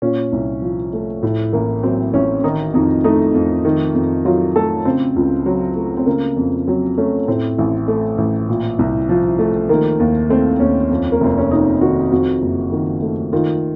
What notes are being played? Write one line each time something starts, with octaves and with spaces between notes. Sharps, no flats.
A#2 C#4
C2
F3
A3
A2
A1 A#3
F#3 C4
A1 C#4
D#3 D#4
F2 D#4
A3 D#4
F2
D#3
F2
F#3 F4
A3 A4
C#3 C4
C#2
F#3
A3
C4
C#3 A#3
F2
F#3 C4
A3 C#4
A2 C4
A1
A3
A1
A#2
C2
F3
A3
D#3 A#3
D#2
A3 C4
D#2 C#4
F2
A#3
F1 C4
C#4
C3 D#4
D#3 F#4
F2 F#4
F#1
D#3
A3
D#3 F4